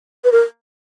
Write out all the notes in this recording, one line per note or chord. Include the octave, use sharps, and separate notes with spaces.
B4
A#4